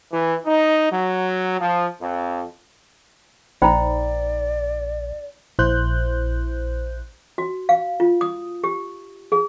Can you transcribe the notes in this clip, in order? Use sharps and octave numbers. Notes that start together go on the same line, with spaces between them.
E3
D#4
F#3
F3
F2
A#1 D#4 C5 D5 G5 A#5 B5
A#1 E4 C5 F#6 G6
F#4
F5
F4
D#6
G4
G#4